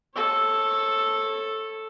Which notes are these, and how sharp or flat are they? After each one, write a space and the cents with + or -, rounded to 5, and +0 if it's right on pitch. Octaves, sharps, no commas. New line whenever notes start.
A4 +0 C#5 -25